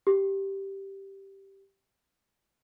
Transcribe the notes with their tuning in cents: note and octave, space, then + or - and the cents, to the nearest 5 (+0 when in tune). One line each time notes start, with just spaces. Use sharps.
G4 -5